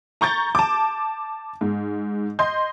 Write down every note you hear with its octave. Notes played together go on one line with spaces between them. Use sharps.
A#5 C#6 G6 A6
A5 D6
G#2
D#5 C6 G6